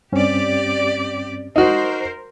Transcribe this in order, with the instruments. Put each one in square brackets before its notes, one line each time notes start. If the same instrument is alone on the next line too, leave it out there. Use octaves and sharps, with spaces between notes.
[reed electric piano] G2 C4 C#4 [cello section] G4 D5
[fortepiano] D#4 F#4 [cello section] A#4 C5